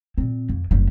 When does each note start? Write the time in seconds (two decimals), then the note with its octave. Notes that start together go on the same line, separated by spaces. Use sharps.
0.18 A#2 C4
0.49 F2
0.71 F#1 G3